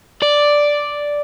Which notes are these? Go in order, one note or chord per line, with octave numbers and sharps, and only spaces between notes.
D5